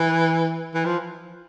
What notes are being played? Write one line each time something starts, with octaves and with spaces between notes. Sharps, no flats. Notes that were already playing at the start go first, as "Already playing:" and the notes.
Already playing: E3
E3
F3